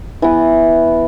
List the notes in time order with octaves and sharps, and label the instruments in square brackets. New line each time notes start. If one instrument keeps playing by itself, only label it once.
[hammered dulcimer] E3 B3